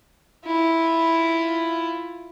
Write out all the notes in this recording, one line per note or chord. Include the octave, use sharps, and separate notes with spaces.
E4 F4